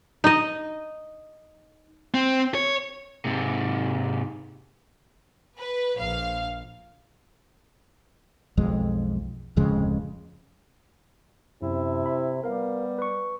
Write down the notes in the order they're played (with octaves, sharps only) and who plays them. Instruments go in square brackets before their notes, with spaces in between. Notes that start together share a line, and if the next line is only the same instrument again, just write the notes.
[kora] D#4 D#5
[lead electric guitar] C4
C#5
[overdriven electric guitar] G#2 C3
[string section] B4
A#1 F5
[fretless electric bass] B1 F2 G#3
D1 F2 C#3 G#3
[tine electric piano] F#2 [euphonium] C3 [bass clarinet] E4
[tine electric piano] B5
[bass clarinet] G3 [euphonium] B3 [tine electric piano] A#4 F5
[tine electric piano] B4 C#6